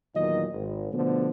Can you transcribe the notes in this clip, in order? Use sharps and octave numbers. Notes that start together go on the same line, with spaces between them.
E2 A#2 D#3 F#3 D#5
G#1
B2 D3 F3 A3 B3